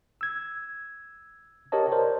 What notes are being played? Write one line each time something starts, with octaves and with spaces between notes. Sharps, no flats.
E6 G#6
G4 A#4 C#5 D#5 A5
A#4 C5 D5